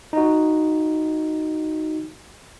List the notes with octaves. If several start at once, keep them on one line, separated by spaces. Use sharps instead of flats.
D#4 F#4